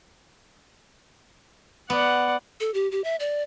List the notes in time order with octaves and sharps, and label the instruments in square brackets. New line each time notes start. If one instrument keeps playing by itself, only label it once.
[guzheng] B3 [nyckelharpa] D5 F#5
[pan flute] A4
G4
G4
E5
D5